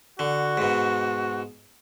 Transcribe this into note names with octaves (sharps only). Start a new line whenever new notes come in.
D3 F#4
G#2 B2